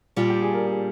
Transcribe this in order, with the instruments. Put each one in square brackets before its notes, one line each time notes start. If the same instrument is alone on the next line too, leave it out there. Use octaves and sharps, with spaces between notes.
[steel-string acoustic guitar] A#2 G3 D4 [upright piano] F4
[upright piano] G4
G#4
A#4
G#4